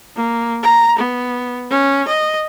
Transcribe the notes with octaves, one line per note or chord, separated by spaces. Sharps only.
A#3
A#5
B3
C#4
D#5